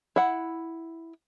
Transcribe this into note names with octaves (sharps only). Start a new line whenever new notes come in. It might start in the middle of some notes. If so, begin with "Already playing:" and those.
E4 F#5